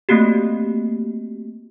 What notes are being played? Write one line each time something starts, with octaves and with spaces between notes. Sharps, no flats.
A3 A#3 C4 F#4 G4